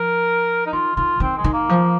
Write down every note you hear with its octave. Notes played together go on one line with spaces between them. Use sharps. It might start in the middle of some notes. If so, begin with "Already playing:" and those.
Already playing: F3 A#4
D#4
D#3 F4
D#3 F4
D#3 C4
G#3
D#3
A#3
F3